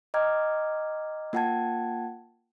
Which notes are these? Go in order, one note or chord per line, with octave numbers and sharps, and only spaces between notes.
D#5 G5 A#5 D6 F6 G#6
A#3 F4 F#5 G5 A5 G#6